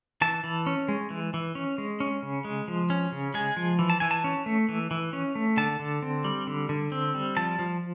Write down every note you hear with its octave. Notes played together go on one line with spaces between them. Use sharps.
E3 A5
E3
C#4
G#3
E3
E3
C#4
G#3
C#4
C#3
G#3
F3
C#4
C#3
G#3 G#5
F3
E3
A5
E3 G#5
A5
C#4
A3
E3
E3
C#4
A3
D3 A5
D3
C4
G3
D3
D3
C4
G3
F3 A5
F3